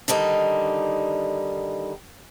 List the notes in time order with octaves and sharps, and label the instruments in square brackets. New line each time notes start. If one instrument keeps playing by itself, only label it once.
[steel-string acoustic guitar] D3 D#3 G3 D#4